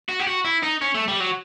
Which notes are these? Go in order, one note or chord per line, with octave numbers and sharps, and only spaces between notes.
F#4
G4
F#4
E4
D#4
C#4
A3
G3
F#3